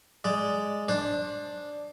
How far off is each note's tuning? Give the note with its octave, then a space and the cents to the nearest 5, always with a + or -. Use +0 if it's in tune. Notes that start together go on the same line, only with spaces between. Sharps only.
G#3 +0 D5 +0
D4 +0 C5 +25